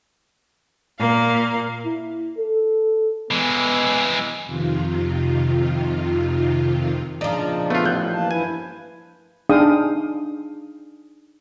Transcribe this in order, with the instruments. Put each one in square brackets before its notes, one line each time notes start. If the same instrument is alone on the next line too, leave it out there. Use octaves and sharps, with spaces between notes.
[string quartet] A#2 A#3 F5
[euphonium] E4
A4
[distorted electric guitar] E3 G#3 [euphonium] B3
[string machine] F2 C3 D#3 F4
[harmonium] A#2 C#3 D4 [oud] F3 D#4 [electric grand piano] D5
[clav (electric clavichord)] A3 F4 [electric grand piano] B3
[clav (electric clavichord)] A1 [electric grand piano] F#6 G6
[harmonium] E3 A#3 A5
[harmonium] G2 E4 B4 [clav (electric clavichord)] G#5
[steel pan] D4 D#4 G#4 F5 G5 D#6